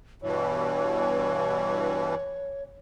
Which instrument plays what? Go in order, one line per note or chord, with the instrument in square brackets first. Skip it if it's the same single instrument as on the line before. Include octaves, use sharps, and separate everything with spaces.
[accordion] G2 B2 E3 [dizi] C#5